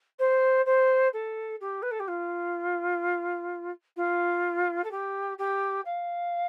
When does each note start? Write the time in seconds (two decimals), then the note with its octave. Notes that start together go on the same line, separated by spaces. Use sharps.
0.19 C5
0.66 C5
1.13 A4
1.61 G4
1.82 B4
1.91 A4
2.00 G4
2.08 F4
3.97 F4
4.84 A4
4.91 G4
5.38 G4
5.85 F5